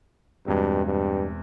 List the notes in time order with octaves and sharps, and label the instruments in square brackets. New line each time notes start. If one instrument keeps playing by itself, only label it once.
[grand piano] E2 B2 G#3 C4 [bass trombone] G2
[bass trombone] G2